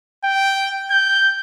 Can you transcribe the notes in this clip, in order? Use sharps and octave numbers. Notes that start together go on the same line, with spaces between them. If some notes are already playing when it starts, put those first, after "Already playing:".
G5
G6